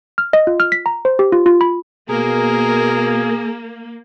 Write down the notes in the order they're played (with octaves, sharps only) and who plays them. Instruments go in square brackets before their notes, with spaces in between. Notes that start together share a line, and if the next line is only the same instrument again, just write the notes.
[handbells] F6
D#5
F4
F6
B6
A#5
C5
G4
F4
F4
B5
[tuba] B2 [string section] A#3 [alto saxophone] G#4 [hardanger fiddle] A#4